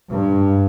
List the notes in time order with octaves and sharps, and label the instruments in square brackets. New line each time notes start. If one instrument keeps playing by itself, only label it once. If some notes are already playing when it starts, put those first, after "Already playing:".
[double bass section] G2